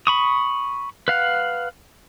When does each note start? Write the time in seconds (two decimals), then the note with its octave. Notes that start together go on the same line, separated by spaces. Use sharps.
0.07 B5 C#6 D#6
1.08 B4 F5 F#5